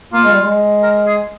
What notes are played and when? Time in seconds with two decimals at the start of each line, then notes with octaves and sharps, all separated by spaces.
0.13 A#3 F4
0.24 G#3
0.32 G3
0.43 G#3
0.83 A#4
1.06 G#4